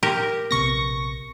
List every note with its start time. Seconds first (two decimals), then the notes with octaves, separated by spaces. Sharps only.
0.03 G4 A#4
0.51 A#1 C3 B3 C#6 A#6